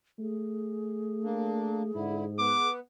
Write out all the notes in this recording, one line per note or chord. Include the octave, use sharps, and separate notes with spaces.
A3 G#4
A#3 D4
G#2 D3 E4
B3 D6